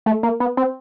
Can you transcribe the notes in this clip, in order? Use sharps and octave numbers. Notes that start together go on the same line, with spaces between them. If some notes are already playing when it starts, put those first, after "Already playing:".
A3
A#3
B3
C4